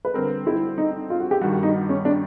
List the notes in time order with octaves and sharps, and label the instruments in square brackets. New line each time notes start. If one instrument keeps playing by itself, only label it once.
[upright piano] B4
[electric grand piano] D3 G3 C4 [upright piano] A#4
[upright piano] E4
D#4
F4
F#4
G4
[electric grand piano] G2 D#3 G3 [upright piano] F#4
[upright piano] F#4
D#4
C#4
D4